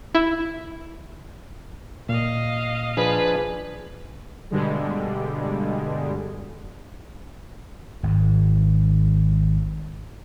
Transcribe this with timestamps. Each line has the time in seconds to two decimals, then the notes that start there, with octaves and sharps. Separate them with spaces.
0.15 E4
2.09 A#2 D#5 F5
2.97 F3 D4 G#4 B4
4.50 G2 B2 D3 G3 G#3
8.03 G#1 G#2